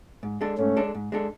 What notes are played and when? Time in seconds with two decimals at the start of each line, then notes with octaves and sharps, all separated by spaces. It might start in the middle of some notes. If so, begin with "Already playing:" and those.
0.23 G#2
0.41 G#3 D4 A4
0.58 G#2 A3 C#4
0.77 G#3 D4 A4
0.95 G#2
1.12 G#3 D4 A4